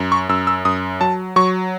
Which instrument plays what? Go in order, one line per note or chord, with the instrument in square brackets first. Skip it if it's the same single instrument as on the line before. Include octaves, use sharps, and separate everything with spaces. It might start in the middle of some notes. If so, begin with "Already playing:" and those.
Already playing: [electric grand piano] F#2
C#6
F#2 E6
E6
F#2 D#6
F#3 A5
F#3 C#6